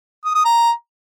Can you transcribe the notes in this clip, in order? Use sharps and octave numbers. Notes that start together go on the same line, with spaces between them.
D#6
D#6
A#5